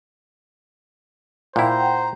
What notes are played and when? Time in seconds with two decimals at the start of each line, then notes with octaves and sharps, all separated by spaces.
1.56 A#2 E4 C5 F#5 G5 A#5